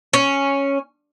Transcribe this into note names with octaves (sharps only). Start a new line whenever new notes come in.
C#4